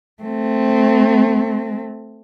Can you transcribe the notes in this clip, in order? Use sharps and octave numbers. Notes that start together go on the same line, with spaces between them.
A3 C4